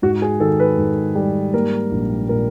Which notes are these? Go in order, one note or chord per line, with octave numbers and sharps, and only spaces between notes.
G#2 F#4
G#4
D#3 A4
B4
G#2
G3
A#3 A#4
A#1
A#2 A#4